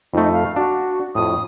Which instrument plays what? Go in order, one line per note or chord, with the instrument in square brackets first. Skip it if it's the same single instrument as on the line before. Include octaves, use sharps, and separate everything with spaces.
[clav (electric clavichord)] F2 A3 [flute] D#4
[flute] F5
[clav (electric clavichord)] D4 [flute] F#4
[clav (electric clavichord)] F2 A2 [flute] D#6